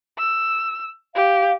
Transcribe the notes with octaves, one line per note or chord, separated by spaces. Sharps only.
E6
G4 F5